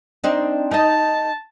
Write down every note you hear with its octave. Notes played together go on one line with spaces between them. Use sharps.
C4 D4 D#4
D#4 D#5 A5